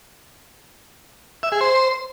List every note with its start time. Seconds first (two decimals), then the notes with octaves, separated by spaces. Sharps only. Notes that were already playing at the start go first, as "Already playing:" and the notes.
1.43 E5
1.52 G#4
1.61 C5